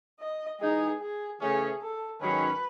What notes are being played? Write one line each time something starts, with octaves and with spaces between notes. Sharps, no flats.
D#5
E3 G#3 D#4 G#4
G#4
C#3 E3 A3 C#4 G#4
A4
G#2 D#3 F#3 C#4 B4